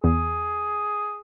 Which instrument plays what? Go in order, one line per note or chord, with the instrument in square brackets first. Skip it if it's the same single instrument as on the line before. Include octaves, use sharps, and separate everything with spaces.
[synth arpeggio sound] E2 [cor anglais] G#4